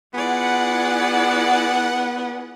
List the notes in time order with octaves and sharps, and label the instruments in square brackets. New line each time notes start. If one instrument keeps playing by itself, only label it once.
[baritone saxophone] B3 [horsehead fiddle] E4 G#4 [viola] F4 D5 [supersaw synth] F#5